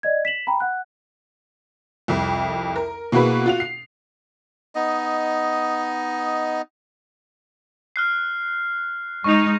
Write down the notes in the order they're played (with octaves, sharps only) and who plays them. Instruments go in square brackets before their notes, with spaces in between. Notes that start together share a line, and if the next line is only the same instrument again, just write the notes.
[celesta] D5 D#5 G#6
B6 E7 F#7
G5 A#5 B5
F#5 F#6
[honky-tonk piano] C2 F2
A#4
B2 A#3 E4 F#4 G#4 B4
F4 F#4 F7
C7
[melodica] B3 D#4 D#5
[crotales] F6 F#6 C7
[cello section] G#3 D#4 [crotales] C#6 F7